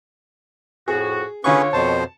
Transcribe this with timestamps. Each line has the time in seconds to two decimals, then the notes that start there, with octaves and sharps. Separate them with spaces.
0.88 F2 A2 F#4 G#4
1.44 D3 C#4 F4 G#4 B4 C#5 C#6
1.73 F2 B2 C5 A5